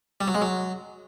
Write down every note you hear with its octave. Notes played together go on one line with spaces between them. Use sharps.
G3
F#3
G#3
F#3